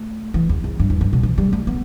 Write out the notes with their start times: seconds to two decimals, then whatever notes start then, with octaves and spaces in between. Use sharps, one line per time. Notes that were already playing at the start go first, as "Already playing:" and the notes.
Already playing: A3
0.34 E3
0.49 E2
0.64 E2
0.79 G2
0.90 E2
1.01 G2
1.13 B2
1.23 E3
1.38 G3
1.53 A3
1.67 B3